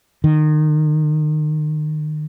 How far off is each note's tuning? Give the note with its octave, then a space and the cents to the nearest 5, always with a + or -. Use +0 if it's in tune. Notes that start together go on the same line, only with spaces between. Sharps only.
D#3 -30